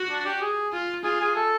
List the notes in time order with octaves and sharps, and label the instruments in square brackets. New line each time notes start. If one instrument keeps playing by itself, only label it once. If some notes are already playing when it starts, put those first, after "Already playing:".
Already playing: [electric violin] F#4
[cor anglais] D4
G4
G#4
[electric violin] F4
[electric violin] F4 [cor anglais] G#4
[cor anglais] G#4
A4